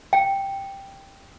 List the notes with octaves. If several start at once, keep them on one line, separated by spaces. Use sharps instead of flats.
G5